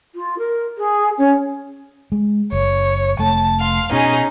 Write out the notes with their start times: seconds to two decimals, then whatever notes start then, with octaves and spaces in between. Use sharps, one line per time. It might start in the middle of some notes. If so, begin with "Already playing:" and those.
0.15 F4
0.38 A#4
0.78 G#4
1.18 C#4
2.12 G#3
2.52 F#1 C#5
3.19 F1 A3 A5
3.59 F5 C6
3.92 B2 C#4 D#4 G#4